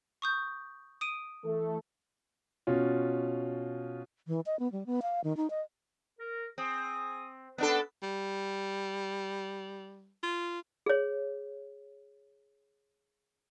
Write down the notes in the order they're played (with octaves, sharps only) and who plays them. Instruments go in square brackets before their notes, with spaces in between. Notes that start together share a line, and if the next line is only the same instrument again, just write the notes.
[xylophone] C#6 D#6 G6
D#6 D7 D#7
[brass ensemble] E3 A3 A4
[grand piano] B2 C#4 F4
[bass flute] E3
D#5
B3
G3
B3
F5
D#3
D#4
D#5
[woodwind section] A#4
[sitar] C4 [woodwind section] G#4 G#5 D#6
[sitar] B3 D4 A4 [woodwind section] C#4 B4
[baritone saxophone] G3
F4
[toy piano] G#4 C#5